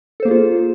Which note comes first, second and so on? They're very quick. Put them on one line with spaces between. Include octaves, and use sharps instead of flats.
A4 C5 A#3 G#4 F4